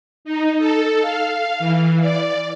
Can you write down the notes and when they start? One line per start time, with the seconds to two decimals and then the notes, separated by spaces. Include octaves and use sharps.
0.25 D#4
0.59 A4
1.02 F5
1.60 E3
2.01 D5